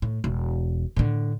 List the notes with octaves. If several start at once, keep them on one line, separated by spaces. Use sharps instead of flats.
A2
E1
A2 D3